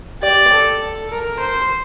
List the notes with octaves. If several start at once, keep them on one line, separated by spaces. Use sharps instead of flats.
G4 D5
A4
A#4
C5